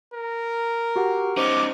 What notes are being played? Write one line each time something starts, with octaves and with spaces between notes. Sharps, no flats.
A#4
F#4 G4 F#5
C#4 D#4 C5 D6